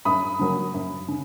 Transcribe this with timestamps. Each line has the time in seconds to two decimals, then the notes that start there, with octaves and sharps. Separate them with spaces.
0.05 F#2 B5 D#6
0.39 C#3 F#3 A#3
0.74 F#2
1.08 C#3